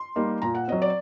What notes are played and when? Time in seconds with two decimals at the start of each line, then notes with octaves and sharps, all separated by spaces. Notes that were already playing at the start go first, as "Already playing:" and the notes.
Already playing: C6
0.16 G3 A#3 D#4
0.42 A#2 A#5
0.55 F#5
0.68 F#3 C4 D#5
0.82 D5